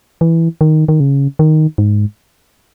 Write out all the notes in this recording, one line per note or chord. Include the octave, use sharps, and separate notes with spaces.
E3
D#3
D#3
C#3
D#3
G#2